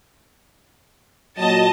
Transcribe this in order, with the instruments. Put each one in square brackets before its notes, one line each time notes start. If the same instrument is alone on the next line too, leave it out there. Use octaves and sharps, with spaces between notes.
[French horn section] A#2 F#3 [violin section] D#5 A5